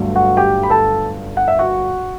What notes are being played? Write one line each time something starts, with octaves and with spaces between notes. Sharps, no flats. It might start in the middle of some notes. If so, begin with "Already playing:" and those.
Already playing: G1 G2 F#3 A3
F#4 F#5
G4 G5
B5
A4 A5
F#5
E5
F#4 F#5